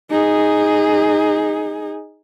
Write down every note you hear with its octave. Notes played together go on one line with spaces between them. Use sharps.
D#4 G#4